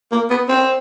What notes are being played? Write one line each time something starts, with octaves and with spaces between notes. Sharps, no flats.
A#3
B3
C4